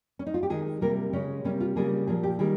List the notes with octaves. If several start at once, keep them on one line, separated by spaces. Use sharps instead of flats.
C#4
D#4
F4
G4
D#3 G#3 G#4
C3 G3 A#3 A#4
C#3 G#3 C#4
C3 G3 A#3 C#4
F4
C#3 G3 A#3 G#4
A#2 F3 A#3 G#4
G4
D#3 G3 A#3 G#4